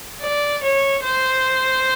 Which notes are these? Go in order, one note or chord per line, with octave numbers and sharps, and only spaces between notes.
D5
C#5
C5